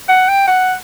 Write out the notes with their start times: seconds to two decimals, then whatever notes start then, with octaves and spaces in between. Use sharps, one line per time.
0.09 F#5
0.28 G5
0.47 F#5